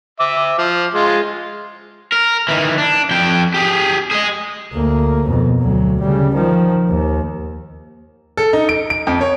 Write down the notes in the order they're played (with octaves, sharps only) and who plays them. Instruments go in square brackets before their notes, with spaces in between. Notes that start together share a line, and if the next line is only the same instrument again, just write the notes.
[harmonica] E5 D6
F3
G#3 F4
[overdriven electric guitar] A#4
D#3 E3
D4
F2 G5
G4 G#4
G#4 D#5
[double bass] D2 A#3
F2 B2
D2 F#3
C#3 G3
D#3 F3
D#2
[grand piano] A4
D#4
D7
D7
F2
C#5